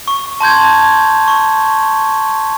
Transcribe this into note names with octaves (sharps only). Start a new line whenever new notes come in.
C#6
A5 C6 G6 G#6
C#6